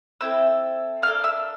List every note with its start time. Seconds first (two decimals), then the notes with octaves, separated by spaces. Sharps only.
0.21 C4 E4 A4 E5 E6
1.02 A#3 D4 A4 F5 F6
1.24 E5 E6